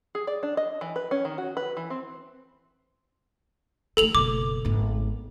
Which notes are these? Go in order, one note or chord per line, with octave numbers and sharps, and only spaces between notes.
G#4
D5
D4
D#5
E3
B4
C#4
D#3
F#4
B4
E3
C4
D#3 A3 A4 F7 F#7
F#1 B2 D6
G#1 B3